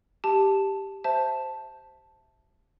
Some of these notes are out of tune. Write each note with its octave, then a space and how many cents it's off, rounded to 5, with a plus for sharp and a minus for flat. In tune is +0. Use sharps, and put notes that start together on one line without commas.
G4 +0 A5 +0
C5 +0 E5 +0 A5 +0